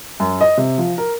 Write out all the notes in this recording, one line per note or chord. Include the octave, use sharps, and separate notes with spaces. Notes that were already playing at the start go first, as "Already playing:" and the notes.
F#2
D#5
C3
F3
A#4